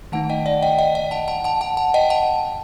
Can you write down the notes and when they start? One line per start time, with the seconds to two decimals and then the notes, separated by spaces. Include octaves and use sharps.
0.12 D#3 A3 D#4 F#5 A5
0.29 D#5 G5
0.46 D5 F#5
0.63 D#5 G5
0.78 D#5 G5
0.95 D#5 G5
1.11 F#5 A5
1.28 F#5 A5
1.44 F#5 A5
1.61 F#5 A5
1.77 F#5 A5
1.94 D#5 G5
2.10 F#5 A5